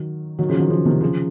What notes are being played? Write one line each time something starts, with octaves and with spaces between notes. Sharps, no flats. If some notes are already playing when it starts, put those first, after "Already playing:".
Already playing: D#3 F#3
D#3 F#3
C#3 F3
D#3 F#3
C#3 F3
C3 D#3
C#3 F3